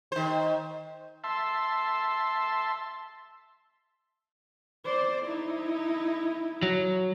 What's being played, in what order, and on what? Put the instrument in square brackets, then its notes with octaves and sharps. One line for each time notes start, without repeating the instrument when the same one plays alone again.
[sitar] D#3 C5
[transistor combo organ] E5 A5 C6
[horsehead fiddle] C5 D5
D#4 E4
[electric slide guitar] F#3